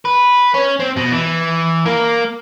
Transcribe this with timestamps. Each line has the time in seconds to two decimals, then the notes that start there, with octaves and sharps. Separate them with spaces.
0.05 B4
0.54 C#4
0.80 C4
0.96 B2
1.12 E3
1.85 A#3